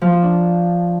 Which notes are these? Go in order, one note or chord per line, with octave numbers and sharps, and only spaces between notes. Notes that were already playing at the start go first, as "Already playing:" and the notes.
F3
F4
D4